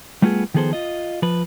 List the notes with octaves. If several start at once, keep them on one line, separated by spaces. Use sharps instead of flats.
G3 A3 B3 F4 F#4 G#4
D#3 F3 B3 G#4 A4 C5
F4 D#5
F3 B4